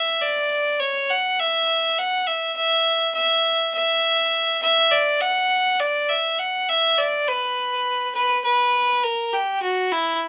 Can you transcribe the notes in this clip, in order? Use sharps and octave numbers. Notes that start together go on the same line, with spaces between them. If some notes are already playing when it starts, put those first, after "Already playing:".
Already playing: E5
D5
C#5
F#5
E5
F#5
E5
E5
E5
E5
E5
D5
F#5
D5
E5
F#5
E5
D5
B4
B4
B4
A#4
G4
F#4
E4